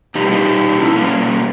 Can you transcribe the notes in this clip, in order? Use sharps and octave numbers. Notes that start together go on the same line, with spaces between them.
B2 G3 D#4 G4
D#4 G4
B2 G3 C#4 E4
A#3 C#4